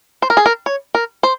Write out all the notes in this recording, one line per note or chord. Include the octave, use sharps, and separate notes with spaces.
C5
A#4
G#4
A#4
C#5
A#4
C5